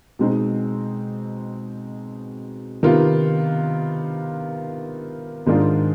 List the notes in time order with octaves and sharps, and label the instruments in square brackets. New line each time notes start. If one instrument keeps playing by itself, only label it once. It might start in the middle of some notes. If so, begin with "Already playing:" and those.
[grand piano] B2 G#3 C4 D#4
C3 D#3 B3 F4
G#2 D#3 G#3 D4 F4